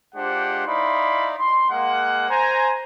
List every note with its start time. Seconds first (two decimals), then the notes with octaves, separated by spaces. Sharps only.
0.15 G#3 D4 F4 G4 C5 F#5
0.66 D#4 E4 D5 F5 B5 C6
1.38 C6
1.70 G#3 A#3 F5 F#5
2.30 C5 G#5 A#5